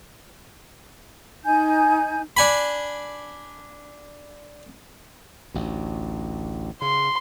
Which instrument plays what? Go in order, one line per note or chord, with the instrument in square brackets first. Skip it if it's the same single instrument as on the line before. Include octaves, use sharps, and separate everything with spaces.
[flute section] D#4 G#5 G6
[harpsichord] D4 G#5 B5
[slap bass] A1 D2
[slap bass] C#3 [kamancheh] C6